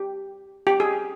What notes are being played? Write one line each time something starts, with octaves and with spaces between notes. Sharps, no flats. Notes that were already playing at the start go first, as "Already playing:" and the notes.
Already playing: G4
G4
G#4